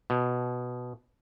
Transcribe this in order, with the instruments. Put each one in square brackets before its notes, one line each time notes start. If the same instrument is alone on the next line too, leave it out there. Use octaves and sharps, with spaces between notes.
[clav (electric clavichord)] B2